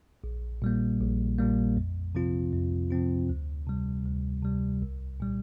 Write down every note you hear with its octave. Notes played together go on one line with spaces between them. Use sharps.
A#1
A#2 G3 A#3
A#1
A#2 G3 A#3
F2
C3 F3 C4 F4
F2
C3 F3 C4 F4
D2
C3 G3
D2
C3 G3
C2
A#2 G3